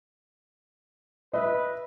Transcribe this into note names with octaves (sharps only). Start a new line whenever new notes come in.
B4 D#5 E5